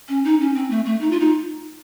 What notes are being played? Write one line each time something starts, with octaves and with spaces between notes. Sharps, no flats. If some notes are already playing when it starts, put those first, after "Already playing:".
C#4
D#4
C#4
C4
A3
A3
D#4
F4
D#4